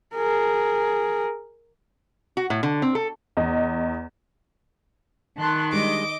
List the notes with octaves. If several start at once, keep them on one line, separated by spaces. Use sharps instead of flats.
G#4 A#4
F#4
A2
D3
C4
A4
E2 D#5
D#3 A5 C6 F#6
G3 G#3 D4 D#5 D6